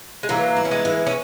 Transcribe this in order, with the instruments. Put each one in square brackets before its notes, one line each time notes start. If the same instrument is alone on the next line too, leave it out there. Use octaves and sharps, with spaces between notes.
[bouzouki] G#3
[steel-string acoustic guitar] E3 [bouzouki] F#3 A#3
[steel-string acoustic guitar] E4
[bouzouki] C#4
G#3 B3
[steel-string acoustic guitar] E3
[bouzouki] C#4